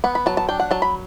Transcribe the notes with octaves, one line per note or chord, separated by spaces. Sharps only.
B3 F#5
B5
F#3 A5
A5
D4 G5
F#5
F#3 A5
B5